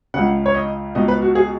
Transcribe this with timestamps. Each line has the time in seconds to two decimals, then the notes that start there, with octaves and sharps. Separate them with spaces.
0.14 C#2 C#3 F#5
0.46 C#5
0.55 D#5
0.95 C#2 B2 D#5
1.08 B4
1.22 F#4
1.35 G#4